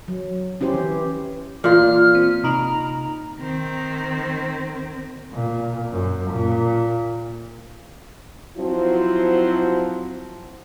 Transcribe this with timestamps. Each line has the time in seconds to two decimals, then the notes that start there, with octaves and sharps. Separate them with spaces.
0.08 F#3
0.61 C#4 E4 G4 C5
0.74 E3
1.64 A#2 E3 F4 F6
2.15 C4
2.44 C3 D#4 A#5
3.39 D#3 C4
5.32 A#2
5.91 F#2
6.31 A#2
8.57 F3 F#3 C4 E4 F#4 C5